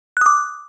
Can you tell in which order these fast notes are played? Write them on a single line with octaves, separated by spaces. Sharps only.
F#6 D#6 D6